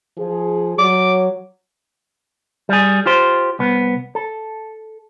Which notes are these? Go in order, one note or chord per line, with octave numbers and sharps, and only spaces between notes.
F3 G#4
F#3 D6
G3 G#4
F4 G4 C5
C2 B3
A4